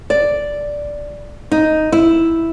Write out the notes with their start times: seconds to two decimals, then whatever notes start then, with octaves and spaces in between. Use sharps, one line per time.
0.10 D5
1.52 D#4
1.92 E4